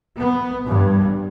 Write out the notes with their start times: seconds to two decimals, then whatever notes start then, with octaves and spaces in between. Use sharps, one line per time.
0.18 B3
0.65 G2